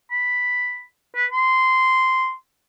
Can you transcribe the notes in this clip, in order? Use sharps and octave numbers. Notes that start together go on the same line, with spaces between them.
B5
B4
C6